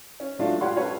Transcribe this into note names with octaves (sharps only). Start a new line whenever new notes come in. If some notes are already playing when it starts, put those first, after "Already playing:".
C#4
A2 F#3 A3 D4 F4 F5
F4 G4 C#5 F#5 C6
C#4 G4 A4 B4 C#5 C#6